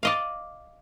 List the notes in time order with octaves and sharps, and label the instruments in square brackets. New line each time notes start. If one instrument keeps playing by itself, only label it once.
[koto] D5 D#5 F5